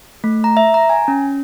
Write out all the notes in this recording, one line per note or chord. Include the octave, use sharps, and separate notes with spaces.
A3
A#5
E5
A#5
G#5
C#4